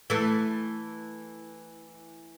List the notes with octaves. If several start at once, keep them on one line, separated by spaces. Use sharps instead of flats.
E3 A3